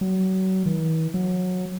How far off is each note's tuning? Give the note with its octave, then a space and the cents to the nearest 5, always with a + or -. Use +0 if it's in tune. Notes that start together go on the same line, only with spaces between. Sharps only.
F#3 +30
E3 -45
F#3 -20